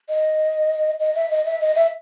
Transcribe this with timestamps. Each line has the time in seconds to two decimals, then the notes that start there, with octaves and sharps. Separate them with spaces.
0.09 D#5
1.00 D#5
1.15 E5
1.30 D#5
1.45 E5
1.60 D#5
1.76 E5